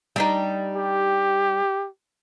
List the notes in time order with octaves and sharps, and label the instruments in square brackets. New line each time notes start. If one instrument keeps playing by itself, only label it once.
[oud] G3 D4 D#4
[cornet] G4